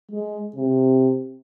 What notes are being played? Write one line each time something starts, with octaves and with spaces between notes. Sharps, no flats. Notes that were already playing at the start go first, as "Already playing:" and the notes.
G#3
C3